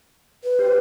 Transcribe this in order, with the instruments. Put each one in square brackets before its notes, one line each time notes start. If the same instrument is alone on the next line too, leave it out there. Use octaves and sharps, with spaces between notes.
[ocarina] B4
[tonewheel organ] G4 C5